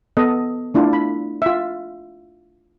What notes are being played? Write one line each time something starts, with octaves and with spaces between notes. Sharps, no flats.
B3 A4 D#5
A3 D4 E4 F4
B5
F4 E5